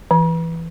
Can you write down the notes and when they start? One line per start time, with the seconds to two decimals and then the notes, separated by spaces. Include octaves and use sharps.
0.11 E3